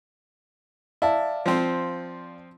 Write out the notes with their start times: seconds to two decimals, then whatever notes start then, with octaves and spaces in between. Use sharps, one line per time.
1.02 E4 D5 F5 A5
1.46 F3 C4